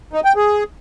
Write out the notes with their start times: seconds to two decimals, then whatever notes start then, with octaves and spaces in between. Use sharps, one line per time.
0.13 D#4
0.24 G5
0.36 G#4